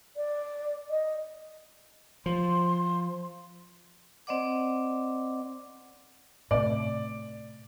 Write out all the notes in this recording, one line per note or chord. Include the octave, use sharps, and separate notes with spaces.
D5
D#5
F3 C6
C4 C5 D5 D#5 F#5 D6
A2 C3 D5